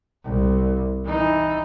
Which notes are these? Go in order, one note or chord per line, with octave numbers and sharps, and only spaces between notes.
C2
E3 D#4